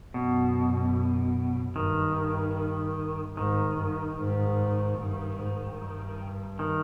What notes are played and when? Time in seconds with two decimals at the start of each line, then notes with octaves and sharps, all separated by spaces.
0.14 F#2 B2
1.75 G2 D#3
3.37 G#2 D#3
3.78 G2
4.18 G#2
4.99 G2
5.38 G#2
5.79 G2
6.59 D#3